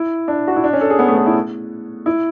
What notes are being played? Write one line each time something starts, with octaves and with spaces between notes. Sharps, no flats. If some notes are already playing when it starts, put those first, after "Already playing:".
Already playing: E4
D4
F#4
E4
D4
C#4
A4
G#4
B3
A3
B3
E4
E4